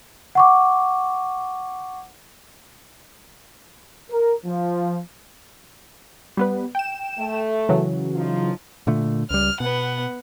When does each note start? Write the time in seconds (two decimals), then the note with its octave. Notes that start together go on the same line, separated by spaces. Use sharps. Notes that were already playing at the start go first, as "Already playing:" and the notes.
0.35 F#5 C#6 D6
4.11 A#4
4.46 F3
6.37 G3 B3 B4
6.75 G5 E7
7.18 A3
7.69 C#3 E3 F#3
8.15 F3 D#4 F4
8.87 A#2 D3 A3
9.30 C#2 G3 F6
9.60 B2 B3 F#5